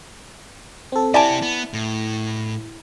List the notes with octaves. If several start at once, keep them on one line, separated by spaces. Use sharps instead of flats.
C4 A4
C4 E4 G4 D5 G#5 A5
B3
A2